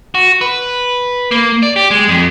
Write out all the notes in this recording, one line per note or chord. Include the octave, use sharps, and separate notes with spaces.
F#4
B4
A#3
D5
G4
G#3
F2